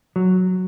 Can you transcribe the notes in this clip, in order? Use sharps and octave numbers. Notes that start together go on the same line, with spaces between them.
F#3